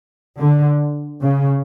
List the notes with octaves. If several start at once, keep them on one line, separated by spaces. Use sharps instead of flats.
D3
C#3